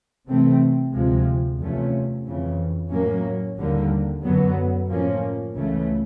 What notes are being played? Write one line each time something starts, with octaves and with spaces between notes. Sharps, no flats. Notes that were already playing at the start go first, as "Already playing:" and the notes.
C3 E3 A3 C4
D2 C3 F3 G#3
E2 C3 F3 A3 C#4
F2 C#3 E3
A2 F#3 A#3 C#4
D#2 D3 G3 A#3
F#2 D3 F#3 B3
A2 F3 A#3 C#4
C#2 C#3 E3 A3